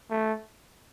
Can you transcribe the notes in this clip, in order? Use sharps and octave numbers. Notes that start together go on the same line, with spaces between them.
A3